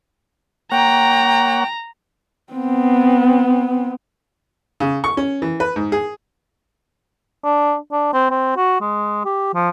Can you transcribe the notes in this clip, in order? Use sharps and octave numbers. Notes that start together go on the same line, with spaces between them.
A#3 C#5 F#5 G5 A#5
B3 C4
C#3
C#6
C#4
E3
B4
G#2
G#4
D4
D4
C4
C4
F#4
G#3
G4
F3